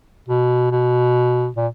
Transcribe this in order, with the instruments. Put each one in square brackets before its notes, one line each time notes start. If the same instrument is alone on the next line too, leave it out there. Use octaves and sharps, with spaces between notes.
[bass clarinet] B2
B2
A#2